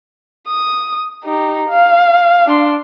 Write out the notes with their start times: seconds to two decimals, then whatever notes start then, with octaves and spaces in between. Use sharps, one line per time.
0.48 D#6
1.25 D#4 G4
1.70 F5
2.47 D4 C6